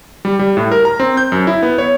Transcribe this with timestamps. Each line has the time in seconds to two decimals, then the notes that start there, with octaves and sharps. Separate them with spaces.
0.25 G3
0.39 G3
0.57 A2
0.72 A#4
0.85 A#5
1.00 C4
1.17 G6
1.32 F#2
1.47 E4
1.63 B3
1.78 C#5